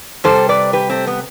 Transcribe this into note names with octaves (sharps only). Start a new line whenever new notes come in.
C3 G3 A4 C5
B4 D5
G4 B4
A3 C4
B3